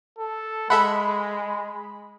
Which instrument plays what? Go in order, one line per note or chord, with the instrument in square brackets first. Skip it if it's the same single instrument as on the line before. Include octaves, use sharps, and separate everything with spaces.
[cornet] A4
[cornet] G#3 [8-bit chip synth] A4 E5 F#5 [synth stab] B5